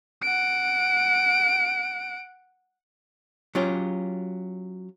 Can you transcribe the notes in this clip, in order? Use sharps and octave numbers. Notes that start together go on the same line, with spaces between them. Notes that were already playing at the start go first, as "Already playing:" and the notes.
F#5 D7
F#3 C#4 F4 G4